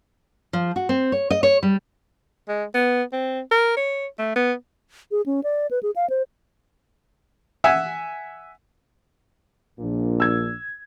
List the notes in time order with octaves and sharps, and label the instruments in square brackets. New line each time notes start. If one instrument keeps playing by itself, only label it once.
[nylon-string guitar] F3
F#4
C4
C#5
D#5
C#5
G3
[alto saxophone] G#3
B3
C4
A#4
C#5
A3
B3
[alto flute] G#4
C#4
D5
B4
G#4
F5
C5
[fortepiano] E5 F#5 G#5
[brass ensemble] A#1 A#2 D4
[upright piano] E6 G#6